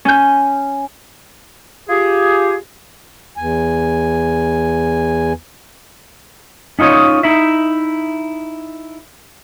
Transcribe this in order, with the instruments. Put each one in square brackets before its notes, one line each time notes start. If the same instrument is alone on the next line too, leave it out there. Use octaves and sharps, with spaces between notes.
[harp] C#4 G6
[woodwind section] F4 G4 G#4
[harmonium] E2 G#5
[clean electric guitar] C#4 D#4 F4 C#5 D#5
D#4 E4 E5